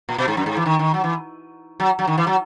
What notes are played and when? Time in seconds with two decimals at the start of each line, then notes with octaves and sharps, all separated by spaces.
0.09 A#2
0.18 B2
0.28 G#2
0.37 F#2
0.46 G#2
0.57 E3
0.66 D#3
0.79 D#3
0.94 F#3
1.04 E3
1.80 F#3
1.99 F#3
2.07 D#3
2.18 E3
2.27 F#3